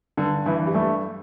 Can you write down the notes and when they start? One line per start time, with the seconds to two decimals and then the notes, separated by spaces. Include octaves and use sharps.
0.17 G2 D3
0.46 G2 E3
0.60 E3
0.67 G3
0.74 G2 A3